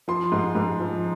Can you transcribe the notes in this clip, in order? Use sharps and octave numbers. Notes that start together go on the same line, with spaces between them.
F3 C6
G#2
G#2
F3